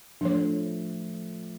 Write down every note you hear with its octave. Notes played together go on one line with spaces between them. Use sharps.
F3 A3 D4 C#5